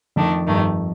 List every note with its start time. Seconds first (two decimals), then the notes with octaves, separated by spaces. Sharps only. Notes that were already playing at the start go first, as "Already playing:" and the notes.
0.16 F2 D#3 A3 D4
0.46 G2 D#3 A3